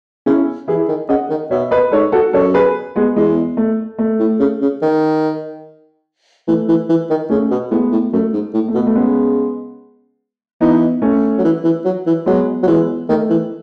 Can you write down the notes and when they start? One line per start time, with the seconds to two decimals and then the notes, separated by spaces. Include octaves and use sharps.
0.26 C#3 C#4 E4
0.68 E3 E4 G#4
0.89 D#3
1.09 C#3 D#5 F#5
1.30 D#3
1.51 B2 C#5 E5
1.71 B4 D#5
1.92 G#2 A4 C#5
2.12 F#4 A4
2.33 F#2 A4 C#5
2.54 G#4 B4
2.96 G#3 B3
3.16 E2 G#3
3.57 A3
3.98 A3
4.20 A2
4.40 C#3
4.62 C#3
4.82 D#3
6.48 E3 A3
6.69 E3
6.89 E3
7.10 D#3
7.30 C#3 A3 C#4
7.51 B2
7.71 A2 G#3 B3
7.92 A2
8.13 F#2 A3
8.33 G#2
8.54 A2
8.68 A3
8.74 B2
8.77 B3
8.87 A3
8.95 C#3 G#3 B3
10.61 E3 B3 D#4
11.02 A3 C#4
11.39 F#3
11.44 E3
11.64 E3
11.85 F#3
12.06 E3
12.26 F#3 G#3 B3
12.63 F#3
12.67 E3 G#3 B3
13.09 D#3 A3
13.30 E3